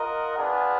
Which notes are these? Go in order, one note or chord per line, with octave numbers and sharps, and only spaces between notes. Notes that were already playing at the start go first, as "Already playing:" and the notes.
Already playing: F4 A#4 D#5 F#5
B3 D4 F4 G#4